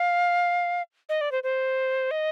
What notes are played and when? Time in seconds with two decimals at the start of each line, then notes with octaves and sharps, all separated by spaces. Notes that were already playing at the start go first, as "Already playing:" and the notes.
Already playing: F5
1.09 D#5
1.21 D5
1.32 C5
1.43 C5
2.11 D#5